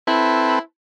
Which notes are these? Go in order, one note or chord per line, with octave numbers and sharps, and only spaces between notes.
C4 E4 A4 B4